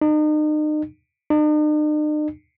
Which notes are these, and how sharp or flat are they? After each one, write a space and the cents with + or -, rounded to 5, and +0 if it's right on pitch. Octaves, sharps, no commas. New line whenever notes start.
D#4 -35
D#4 -45